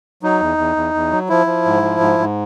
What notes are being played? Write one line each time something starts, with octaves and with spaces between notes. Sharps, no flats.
F#3 D#4
E2
E2
E2
E2
F#3
F3 E4
F3
G#2
F3
G#2
G#2